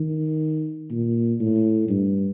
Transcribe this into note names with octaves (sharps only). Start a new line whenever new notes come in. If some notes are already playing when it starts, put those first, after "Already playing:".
Already playing: D#3
A#2
A2
G2